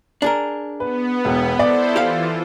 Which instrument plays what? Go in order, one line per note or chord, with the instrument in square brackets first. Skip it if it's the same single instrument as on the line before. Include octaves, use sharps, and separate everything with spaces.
[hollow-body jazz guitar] D4 G#4 A#4
[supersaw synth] B3 [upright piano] B4
[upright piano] E1
[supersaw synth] E4 A4 C5 [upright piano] D5
[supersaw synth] E3 F4 [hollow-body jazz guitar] G4 F5